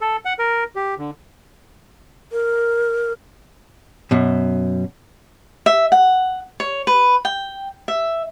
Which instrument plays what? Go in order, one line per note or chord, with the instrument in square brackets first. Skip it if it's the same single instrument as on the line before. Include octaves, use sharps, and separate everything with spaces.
[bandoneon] A4
F#5
A#4
G4
D3
[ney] A#4
[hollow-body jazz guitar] F#2 B2
[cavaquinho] E5
F#5
C#5
B4
G5
E5